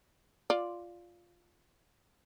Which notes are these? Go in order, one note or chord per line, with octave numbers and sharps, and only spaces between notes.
F4 D5